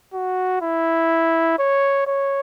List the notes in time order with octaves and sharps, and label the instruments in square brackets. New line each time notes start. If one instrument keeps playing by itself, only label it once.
[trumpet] F#4
E4
C#5
C#5